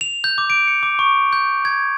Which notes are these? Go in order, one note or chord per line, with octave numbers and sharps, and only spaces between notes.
F7
G6
D6
D7
C#7
D6
C#6
G6
G#6